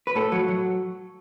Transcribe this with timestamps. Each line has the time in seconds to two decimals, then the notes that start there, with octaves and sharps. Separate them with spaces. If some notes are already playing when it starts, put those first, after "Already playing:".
0.07 B4
0.15 A2 A4
0.32 F#3
0.48 F#3